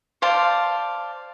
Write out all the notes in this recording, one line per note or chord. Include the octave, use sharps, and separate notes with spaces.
C5 D5 F5 A5